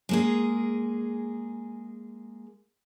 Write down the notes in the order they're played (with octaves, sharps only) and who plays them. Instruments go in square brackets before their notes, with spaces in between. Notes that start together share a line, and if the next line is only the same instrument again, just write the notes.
[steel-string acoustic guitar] G#3 A#3 G#4